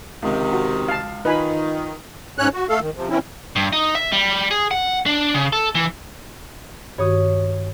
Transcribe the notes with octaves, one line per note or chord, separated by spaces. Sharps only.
C#2 C3 D#3
F#4
F5 A5
D#3 D#4 F4 B4 G#5 B5
G#2 C#4 C#5 F#6
F#4
A3 A4 F5
D#3
C3 F3
E3 C4 C#4 E4
G2
D#4
E5
G3
G#4
F#5
D4
C#3
A4
E3
G2 D#3 F#4 C#5 D#6